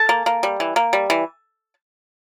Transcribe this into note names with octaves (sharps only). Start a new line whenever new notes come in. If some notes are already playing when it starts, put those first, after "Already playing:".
Already playing: A4 A5
A#3
A#3
G3
E3
A#3
G3
E3